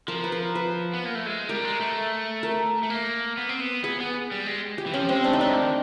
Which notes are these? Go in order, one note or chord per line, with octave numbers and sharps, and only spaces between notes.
F3 A#4
B4
A#4
B4
B3
A#3
A3
G#3
G3 A#4
G#3
A3
A#4
A3
A#3
B3
C4
B3
B3 G#4
B3
G3
G#3
G4
E3
F3 C#4
G#3 C4
A3 D4
D#4
A3 D4
D#3